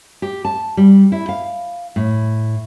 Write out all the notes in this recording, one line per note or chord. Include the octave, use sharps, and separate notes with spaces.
G4
A5
G3
E4
F5
A2